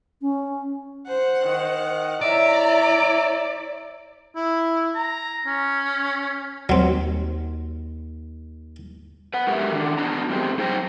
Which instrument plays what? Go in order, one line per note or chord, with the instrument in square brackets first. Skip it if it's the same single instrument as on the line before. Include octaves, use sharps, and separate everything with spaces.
[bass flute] C#4
[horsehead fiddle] C5 [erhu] F#5
[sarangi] D#3
[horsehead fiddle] E4 C#5 [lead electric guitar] D5 [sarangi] E5 [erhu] A#5
[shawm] E4
A#5
C#4
[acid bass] D#2 [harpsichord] F#3 C4
[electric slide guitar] B4 F#5
G#3 F#4 G4 A4 A#4 E5
D#3 D4
B3 D4 F#4 A#5
G3 A3 C4 G4 G#4
F#2 D#4 G#4 C5 G5 A#5